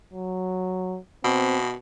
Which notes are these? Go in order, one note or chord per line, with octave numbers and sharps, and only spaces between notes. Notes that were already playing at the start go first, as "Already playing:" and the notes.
F#3
B2 C4